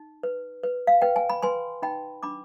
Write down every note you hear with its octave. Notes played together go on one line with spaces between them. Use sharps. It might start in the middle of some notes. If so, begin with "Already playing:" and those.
Already playing: D#4
B4
B4
F5
B4 G5
G#5
B5
B4 G#5 C6
D#4 G5 B5
D4 B5 D6